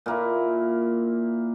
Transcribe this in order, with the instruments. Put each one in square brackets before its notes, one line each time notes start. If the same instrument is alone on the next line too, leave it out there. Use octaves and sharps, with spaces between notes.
[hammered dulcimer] A#2 A#3 E4